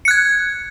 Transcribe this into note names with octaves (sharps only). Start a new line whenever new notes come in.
F#6 G#6 C#7